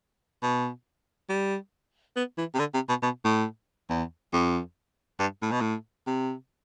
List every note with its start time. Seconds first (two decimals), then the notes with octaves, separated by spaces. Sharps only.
0.43 B2
1.29 G3
2.16 B3
2.38 E3
2.54 C3
2.59 D3
2.74 C3
2.89 B2
3.02 B2
3.25 A2
3.90 E2
4.33 F2
5.20 G2
5.42 A2
5.51 B2
5.61 A2
6.07 C3